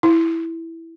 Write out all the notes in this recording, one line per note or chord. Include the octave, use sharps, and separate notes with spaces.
E4